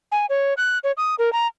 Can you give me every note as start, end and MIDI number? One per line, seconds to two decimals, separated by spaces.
0.12 0.26 80
0.29 0.54 73
0.57 0.78 90
0.84 0.92 73
0.97 1.15 87
1.18 1.32 70
1.33 1.47 82